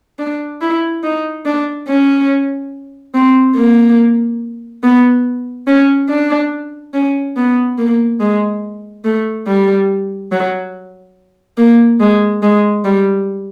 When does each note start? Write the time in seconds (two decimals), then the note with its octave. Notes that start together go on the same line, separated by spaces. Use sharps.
0.19 D4
0.61 E4
1.04 D#4
1.46 D4
1.88 C#4
3.15 C4
3.57 A#3
4.84 B3
5.67 C#4
6.10 D4
6.94 C#4
7.37 B3
7.78 A#3
8.21 G#3
9.05 A3
9.47 G3
10.32 F#3
11.58 A#3
12.00 G#3
12.43 G#3
12.85 G3